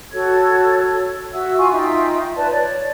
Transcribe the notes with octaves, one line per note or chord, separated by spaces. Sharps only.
F#4 A4 C#5 G#6
F#4 E5 F#5 E6
F4 F#5 G#5 C#6
D#4 F4 E5 G5
B4 D5 A5
C#5 D5